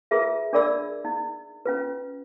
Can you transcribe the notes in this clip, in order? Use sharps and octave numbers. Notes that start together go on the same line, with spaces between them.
F4 G#4 A#4 B4 E5
D4 G#4 A#4 D5 B5 E6
D#4
C#4 F4 B4